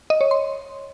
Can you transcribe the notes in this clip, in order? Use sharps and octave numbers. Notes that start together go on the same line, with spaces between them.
D#5
C#5
C6